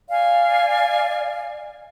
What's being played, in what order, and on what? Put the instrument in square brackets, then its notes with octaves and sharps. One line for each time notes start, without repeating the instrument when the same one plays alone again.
[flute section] D5 F5 G#5